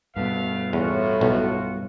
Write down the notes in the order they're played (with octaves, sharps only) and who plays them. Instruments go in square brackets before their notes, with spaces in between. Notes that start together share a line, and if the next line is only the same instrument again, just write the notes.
[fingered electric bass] G2 B2 [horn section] A3 B3 F5
[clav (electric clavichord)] E2 [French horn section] A2 [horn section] F4 F#4
[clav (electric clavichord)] B1